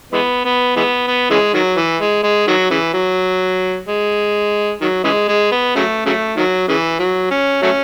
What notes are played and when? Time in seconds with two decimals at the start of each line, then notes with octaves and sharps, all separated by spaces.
0.13 E3 G#3 B3
0.45 B3
0.76 E3 G#3 B3
1.07 B3
1.30 C#3 E3 G#3
1.54 D#3 F#3
1.76 E3
2.00 G#3
2.23 G#3
2.47 D#3 F#3
2.70 C#3 E3
2.94 F#3
3.87 G#3
4.81 D#3 F#3
5.04 C#3 E3 G#3
5.28 G#3
5.52 B3
5.75 C#3 F#3 A3
6.06 C#3 F#3 A3
6.36 D#3 F#3
6.68 C#3 E3
6.99 F#3
7.31 C#4
7.62 F#3 A3 C#4